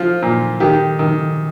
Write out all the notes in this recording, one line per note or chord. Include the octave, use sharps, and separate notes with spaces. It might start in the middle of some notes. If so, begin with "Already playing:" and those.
Already playing: F3 F4
A#2
D#3 G4
D#3